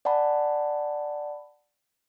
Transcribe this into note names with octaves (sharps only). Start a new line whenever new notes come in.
D5 F#5 G#5 A5 B5